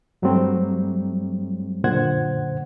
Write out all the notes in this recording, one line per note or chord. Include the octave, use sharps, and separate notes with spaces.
G2 F#3 G3 A3 C4
F#2 A#2 D3 C5 F#5 G#6